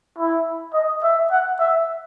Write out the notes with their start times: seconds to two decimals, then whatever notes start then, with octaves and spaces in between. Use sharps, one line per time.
0.18 E4
0.74 D#5
1.03 E5
1.31 F#5
1.60 E5